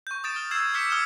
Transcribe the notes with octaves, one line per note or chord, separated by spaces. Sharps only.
C#6 G6
D#6 G6 A6 D7 E7
F6
E6 G#6 C7 E7
D6 F6 G6 B6 C#7 E7
D#6 F6 C#7 E7